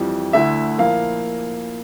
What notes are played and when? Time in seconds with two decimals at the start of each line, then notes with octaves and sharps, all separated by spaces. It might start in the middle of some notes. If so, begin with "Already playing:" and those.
Already playing: F2 E3 G3
0.33 D2 D3 A3 E4 E5
0.78 A#2 F3 A#3 E4 F5